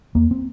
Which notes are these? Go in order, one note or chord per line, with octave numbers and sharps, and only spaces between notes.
E2 A#3
C4